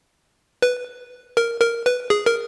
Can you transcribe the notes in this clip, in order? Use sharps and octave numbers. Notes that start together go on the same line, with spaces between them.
B4
A#4
A#4
B4
G#4
A#4